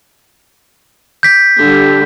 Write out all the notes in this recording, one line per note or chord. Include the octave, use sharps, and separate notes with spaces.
G6 B6
D3 G3